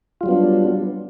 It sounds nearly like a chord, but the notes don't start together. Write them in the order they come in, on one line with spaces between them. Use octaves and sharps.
F4 G3 F#3 B3 D4